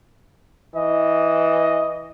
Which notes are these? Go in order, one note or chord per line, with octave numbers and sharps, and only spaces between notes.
E3 D#5